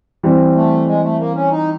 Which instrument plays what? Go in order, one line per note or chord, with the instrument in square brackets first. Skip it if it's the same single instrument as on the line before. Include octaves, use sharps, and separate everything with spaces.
[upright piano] E3 G3 C4
[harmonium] A3
G#3
A3
A#3
C#4
D#4